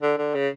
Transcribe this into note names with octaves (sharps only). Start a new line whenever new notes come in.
D3
D3
C#3